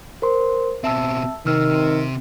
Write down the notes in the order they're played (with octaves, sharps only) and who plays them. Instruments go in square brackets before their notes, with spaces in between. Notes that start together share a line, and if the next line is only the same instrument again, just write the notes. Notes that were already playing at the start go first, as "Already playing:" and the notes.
[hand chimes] A#4 C5 C6
[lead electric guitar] B2 C4 [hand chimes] E5 A5 E6
[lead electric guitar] C3 C4 [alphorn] D#3 [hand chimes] E6 F6